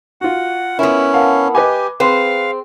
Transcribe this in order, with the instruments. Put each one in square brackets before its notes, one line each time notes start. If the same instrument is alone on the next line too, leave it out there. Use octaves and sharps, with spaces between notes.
[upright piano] F4 F#4 [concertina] F#5
[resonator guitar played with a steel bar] B3 E4 [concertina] C#4 [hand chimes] A#4
[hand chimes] A#4 F#5 A5 [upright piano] F5
[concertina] G4 [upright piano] B4 D#5 G#5 [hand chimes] D6
[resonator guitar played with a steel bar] C4 [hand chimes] G#4 [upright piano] B4 [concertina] F5